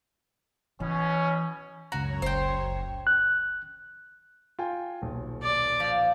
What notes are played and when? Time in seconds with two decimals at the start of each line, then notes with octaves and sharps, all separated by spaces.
0.80 B2 E3 C#4
1.92 C#2 F#2 F#4 C#5 A#5
2.22 F#1 C5 G5
3.07 F#6
4.59 F4 G5 G#5
5.02 D#1 B1
5.43 D5
5.80 F3